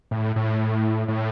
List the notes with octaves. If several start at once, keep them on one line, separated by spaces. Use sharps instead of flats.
A2
A2
A2